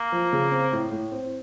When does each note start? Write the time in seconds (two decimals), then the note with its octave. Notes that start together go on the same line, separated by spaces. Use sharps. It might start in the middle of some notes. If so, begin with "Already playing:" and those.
Already playing: A#3
0.12 F3
0.33 C#3
0.52 C4
0.72 A2
0.92 A2
1.12 C4